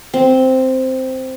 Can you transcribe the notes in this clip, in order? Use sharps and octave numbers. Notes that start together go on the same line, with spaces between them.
C4